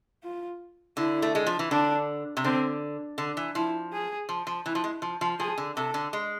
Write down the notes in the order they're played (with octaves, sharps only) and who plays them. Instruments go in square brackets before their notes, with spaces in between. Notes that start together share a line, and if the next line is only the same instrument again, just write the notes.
[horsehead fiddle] F4
[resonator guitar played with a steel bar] D3 [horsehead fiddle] E4
[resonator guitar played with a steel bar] A3
G#3
F3
E3
[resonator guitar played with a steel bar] D3 [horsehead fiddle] D4
[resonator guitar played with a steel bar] C3
[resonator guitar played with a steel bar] D3 [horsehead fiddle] C4
[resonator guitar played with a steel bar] D3
E3
[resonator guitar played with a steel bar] F3 [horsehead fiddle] E4
[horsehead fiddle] G#4
[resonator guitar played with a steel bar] F3
F3
[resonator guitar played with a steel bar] E3 [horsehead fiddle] E4
[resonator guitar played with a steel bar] F3
G#3
F3
F3
[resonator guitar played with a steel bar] F3 [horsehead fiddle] G#4
[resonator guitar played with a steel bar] D3
[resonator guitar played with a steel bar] C3 [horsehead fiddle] A4
[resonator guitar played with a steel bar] D3
G#3